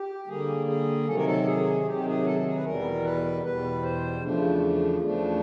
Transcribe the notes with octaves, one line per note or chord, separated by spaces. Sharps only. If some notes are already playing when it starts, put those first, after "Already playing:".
Already playing: G4
D3 G3 A#3 G#4
G#4
C3 D#3 F#3 A4
A#4
A4
G#4
C3 D#3 F#3 G4
G#4
A4
G#4
B4
E2 B2 G3 A#4
B4
E2 B2 G3 B4
C5
E2 C#3 F3 A3 D4
E2 C#3 F3 A3 D4